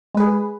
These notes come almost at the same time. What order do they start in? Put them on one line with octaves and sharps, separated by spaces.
G#3 B4 G#4